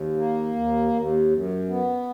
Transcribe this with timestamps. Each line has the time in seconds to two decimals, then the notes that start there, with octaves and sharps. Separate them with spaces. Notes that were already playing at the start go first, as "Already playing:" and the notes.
Already playing: D#2
0.17 A#3
0.55 D#2
0.93 D#2
1.31 F#2
1.68 B3